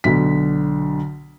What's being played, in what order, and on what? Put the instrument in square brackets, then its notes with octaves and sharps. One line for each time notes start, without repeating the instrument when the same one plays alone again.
[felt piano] B1 D3 B6